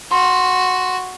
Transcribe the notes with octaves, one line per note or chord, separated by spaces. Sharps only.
F#4 C6